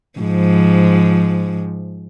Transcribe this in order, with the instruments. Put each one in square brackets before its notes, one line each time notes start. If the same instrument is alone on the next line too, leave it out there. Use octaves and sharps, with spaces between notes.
[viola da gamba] G#2 F3